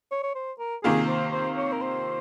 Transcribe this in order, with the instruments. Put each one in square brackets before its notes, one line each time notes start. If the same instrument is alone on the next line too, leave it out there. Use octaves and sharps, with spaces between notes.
[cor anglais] C#5
C#5
C5
A#4
[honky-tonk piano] C3 D#3 A#3 F4 [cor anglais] G#4
[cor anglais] C5
C5
C#5
A#4
C5